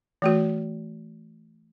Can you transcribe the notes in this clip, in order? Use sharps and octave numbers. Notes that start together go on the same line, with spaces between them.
E3 A3 F#4